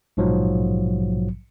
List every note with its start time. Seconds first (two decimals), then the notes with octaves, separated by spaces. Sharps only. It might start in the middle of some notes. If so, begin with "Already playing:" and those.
0.17 A#1 G#2 B2 F3 F#3